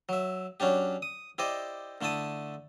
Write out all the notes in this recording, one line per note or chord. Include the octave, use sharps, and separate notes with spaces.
F#3 E5
F#3 C#4 D4 G4
D#6
E4 G4 C5 D5 D#5
D3 A3 E4 E5 A5 D#6